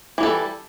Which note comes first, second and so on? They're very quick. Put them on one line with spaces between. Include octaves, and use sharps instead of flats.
E3 G3 A4